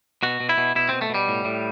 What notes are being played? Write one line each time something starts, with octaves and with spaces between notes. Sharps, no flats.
B2 F#4
B2
E4
B2
B2 E4
B2 C4
A3
B2 G3
A2
A2